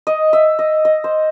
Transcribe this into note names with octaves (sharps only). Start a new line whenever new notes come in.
D#5
E5
D#5
D#5
C5